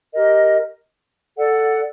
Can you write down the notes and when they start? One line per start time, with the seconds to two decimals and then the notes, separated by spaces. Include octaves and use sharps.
0.14 G4 A#4 D#5
1.37 A4 D5 F#5